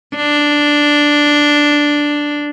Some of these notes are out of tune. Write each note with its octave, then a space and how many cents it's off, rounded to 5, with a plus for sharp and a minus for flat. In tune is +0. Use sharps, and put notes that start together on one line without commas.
D4 +0